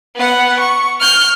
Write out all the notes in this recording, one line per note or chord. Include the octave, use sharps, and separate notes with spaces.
B3 F#5
C#6
F6 G6